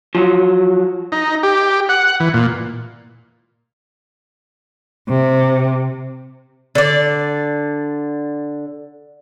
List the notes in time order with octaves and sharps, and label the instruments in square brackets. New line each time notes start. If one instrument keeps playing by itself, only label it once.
[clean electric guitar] F3 F#3
[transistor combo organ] D#4
G4
F#5
E3
A#2
[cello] C3
[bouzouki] D3 D5